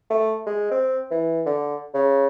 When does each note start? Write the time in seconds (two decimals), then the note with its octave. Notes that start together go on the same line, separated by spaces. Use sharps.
0.10 A3
0.46 G#3
0.71 C4
1.11 E3
1.46 D3
1.94 C#3